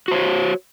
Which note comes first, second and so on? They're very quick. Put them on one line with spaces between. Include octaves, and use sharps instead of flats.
F#4 C5 C#5